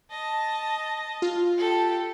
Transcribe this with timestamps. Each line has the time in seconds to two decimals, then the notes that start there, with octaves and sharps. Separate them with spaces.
0.11 D#5 A5
1.22 F4
1.58 G4 A4